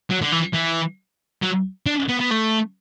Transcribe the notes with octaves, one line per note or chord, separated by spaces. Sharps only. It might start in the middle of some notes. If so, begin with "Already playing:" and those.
F#3
D3
E3
E3
F#3
D4
B3
B3
A3